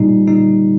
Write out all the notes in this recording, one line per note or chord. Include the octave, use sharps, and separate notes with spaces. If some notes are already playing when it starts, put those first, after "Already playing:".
Already playing: A#2 G3 D#4
A#2 G3 D#4